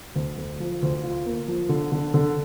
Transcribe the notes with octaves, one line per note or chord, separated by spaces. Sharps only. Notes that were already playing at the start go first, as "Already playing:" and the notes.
D2
D2
F3
D2
F4
A#3
F3
D3
D3
D3